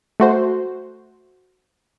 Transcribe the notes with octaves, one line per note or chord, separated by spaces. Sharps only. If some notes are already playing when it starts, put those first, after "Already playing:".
A3 F#4 C5